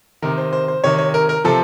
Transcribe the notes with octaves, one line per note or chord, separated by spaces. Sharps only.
C3 D#3 A#4
C5
C5
C5
C3 D#3 C#5
C#5
A#4
A#4
C3 F3 A4